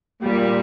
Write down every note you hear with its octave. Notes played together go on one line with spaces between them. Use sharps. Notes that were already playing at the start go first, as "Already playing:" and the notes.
A#2 G3